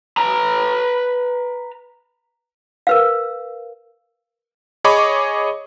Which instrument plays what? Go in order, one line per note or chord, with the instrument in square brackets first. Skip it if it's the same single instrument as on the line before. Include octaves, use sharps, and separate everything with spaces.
[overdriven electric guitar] B4 A#5
[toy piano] A#4 B4 F5
[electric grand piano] G#4 C#5 D#5 B5 C#6 D6